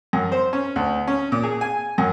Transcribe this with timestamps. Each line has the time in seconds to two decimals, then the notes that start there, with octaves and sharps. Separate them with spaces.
0.13 F#2
0.32 C5
0.53 C#4
0.76 D2
1.08 C#4
1.32 A#2
1.43 G#4
1.61 G#5
1.98 F#2